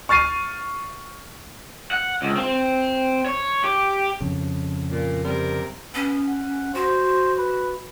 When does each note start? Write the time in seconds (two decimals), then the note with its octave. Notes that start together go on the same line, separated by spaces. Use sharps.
0.09 C#6 F6 A6 C7 D#7
1.91 F#5
2.22 C#2
2.37 C4
3.25 C#5
3.64 G4
4.21 F2 C#3
4.90 A#2
5.23 C3 G3 A#4
5.95 B3 C#4
6.28 F#5
6.75 F#4 C5
7.38 B4